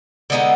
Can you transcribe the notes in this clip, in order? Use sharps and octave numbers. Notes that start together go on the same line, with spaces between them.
D3 G#3 B3 D#4